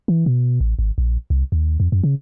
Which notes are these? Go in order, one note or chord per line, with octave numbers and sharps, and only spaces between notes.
E3
B2
A1
G#1
A#1
C2
D#2
F2
F#2
C#3